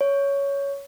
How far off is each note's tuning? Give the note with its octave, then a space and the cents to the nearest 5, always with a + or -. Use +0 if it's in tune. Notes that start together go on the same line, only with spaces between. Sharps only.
C#5 +10